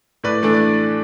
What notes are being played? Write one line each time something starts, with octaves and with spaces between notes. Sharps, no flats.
A2 B4 D5
E3 A3 D4
D5